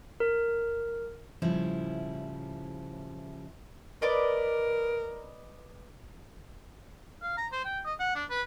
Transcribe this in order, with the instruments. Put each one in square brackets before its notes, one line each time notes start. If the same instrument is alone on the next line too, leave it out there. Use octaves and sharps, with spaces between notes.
[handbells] A#4
[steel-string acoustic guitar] A2 C#3 F3 G3 E4
[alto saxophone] A#4 [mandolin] B4 D5 D#5
[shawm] F5
A#5
C5
G5
D#5
F#5
D4
B4